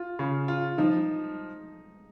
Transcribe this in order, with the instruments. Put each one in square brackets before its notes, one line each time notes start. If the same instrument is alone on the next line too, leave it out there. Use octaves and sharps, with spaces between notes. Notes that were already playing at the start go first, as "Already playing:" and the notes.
Already playing: [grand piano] F4
C#3
F4
[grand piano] F3 [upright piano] D#4